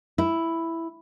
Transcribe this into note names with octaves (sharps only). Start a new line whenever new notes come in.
E4